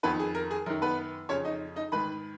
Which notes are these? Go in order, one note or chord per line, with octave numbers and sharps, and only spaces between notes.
F2 D#3 B3 B4
G#4
A#4
G#4
F#2 D#3 A#4
B3 B4
F2 C#3 C#4 C#5
D#4 D#5
D#4 D#5
G#2 D#3 B4 B5